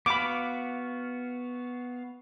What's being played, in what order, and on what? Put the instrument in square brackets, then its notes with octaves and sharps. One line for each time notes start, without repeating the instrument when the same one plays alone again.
[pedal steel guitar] B3 F#4 F5 [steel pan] B5 D6